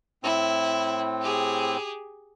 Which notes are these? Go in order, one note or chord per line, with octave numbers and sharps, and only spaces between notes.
A2 C4 E4
G4 G#4